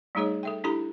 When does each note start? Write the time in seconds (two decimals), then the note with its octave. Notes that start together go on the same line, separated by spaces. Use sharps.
0.15 G3 A3 D#4 G#4 C#5 D#5
0.43 A4 E5 G5
0.64 D4 E4 G4 A4 A#5 B5